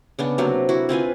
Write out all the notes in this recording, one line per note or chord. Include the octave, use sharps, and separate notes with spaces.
C#3 B3 D4
C3 F#3 A#3
E4 F#4
C4 F4 B4 G#5